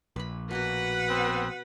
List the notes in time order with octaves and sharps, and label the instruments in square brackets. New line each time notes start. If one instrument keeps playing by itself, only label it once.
[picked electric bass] A#1 [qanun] B4 B5
[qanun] B2 A#3 F#4 [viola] B4 F#5
[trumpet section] B3 C4